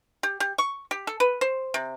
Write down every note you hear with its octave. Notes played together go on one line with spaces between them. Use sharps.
G4
G4
C#6
G4
A4
B4
C5
C3